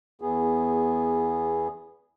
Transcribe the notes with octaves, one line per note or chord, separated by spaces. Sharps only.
E2 B3 G#4